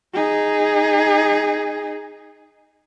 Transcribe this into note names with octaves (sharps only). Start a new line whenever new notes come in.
D#4 G#4